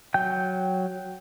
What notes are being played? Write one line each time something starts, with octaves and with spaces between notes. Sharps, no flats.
F#3 G5 G6